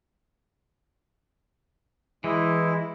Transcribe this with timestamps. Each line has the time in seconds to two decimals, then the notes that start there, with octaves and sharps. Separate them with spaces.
2.24 E3 G#3 E4